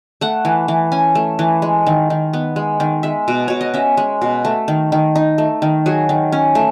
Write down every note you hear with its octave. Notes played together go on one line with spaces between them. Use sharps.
A3 F#5
E3
E3
C#4 G#5
A3
E3
G#3
D#3
D#3
B3
G#3
D#3
G#3 E5
B2
B2 C#5
D#5
C#4 E5
G#3
B2
A3
D#3
D#3
D#4
A3
D#3
F#3 G#4
D#3
C#4
A3